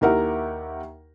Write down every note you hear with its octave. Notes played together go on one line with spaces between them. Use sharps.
D#2 E4 G4 A#4 E5 F#5